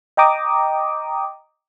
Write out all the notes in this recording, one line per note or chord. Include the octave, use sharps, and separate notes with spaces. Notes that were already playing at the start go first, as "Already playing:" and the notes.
D#5 G5 A#5 D6 D#6